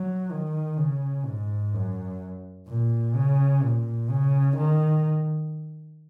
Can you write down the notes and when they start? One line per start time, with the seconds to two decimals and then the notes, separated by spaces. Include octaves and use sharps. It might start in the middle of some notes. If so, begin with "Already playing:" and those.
Already playing: F#3
0.31 D#3
0.78 C#3
1.25 G#2
1.74 F#2
2.68 A#2
3.16 C#3
3.63 A#2
4.10 C#3
4.57 D#3